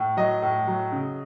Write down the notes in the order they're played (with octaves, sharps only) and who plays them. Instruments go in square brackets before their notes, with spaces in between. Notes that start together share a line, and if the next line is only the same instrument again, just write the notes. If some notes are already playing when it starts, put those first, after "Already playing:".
Already playing: [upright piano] A2
F#3 D#5
A2
F#3
C#3